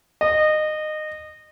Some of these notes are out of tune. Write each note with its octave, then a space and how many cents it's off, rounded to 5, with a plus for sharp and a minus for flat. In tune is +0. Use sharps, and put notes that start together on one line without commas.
D#5 -20